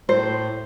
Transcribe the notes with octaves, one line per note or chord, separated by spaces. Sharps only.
A2 C5